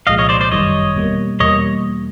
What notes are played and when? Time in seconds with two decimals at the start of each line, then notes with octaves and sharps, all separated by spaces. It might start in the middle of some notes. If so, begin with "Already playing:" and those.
0.07 C2 A#2 F3 G#3 D#5 F5
0.18 C#5 D#5
0.29 C5 D5
0.41 C5 D5
0.51 G1 F#2 D#3 G3 C#5 D#5
0.95 E2 B2 G3 A#3
1.40 E2 B2 G3 A#3 C#5 D#5